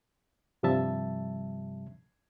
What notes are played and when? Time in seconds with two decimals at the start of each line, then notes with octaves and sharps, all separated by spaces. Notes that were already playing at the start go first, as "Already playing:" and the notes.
0.63 G2 C3 F3 G3 E5 A5